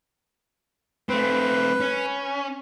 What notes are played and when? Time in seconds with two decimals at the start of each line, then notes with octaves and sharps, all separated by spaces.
1.09 A3 C4 B4
1.80 C#4